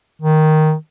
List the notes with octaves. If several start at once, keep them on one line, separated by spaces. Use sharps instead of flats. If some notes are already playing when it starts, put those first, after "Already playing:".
D#3